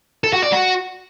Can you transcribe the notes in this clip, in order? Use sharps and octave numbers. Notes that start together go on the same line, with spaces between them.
A4
F#4
D5
F#4